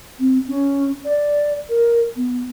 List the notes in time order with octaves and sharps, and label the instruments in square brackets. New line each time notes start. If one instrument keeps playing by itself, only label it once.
[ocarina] C4
C#4
D5
A#4
B3